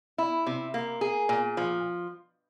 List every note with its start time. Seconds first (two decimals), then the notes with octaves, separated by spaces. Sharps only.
0.18 E4
0.47 C3
0.74 A#3
1.01 G#4
1.29 A#2
1.57 F3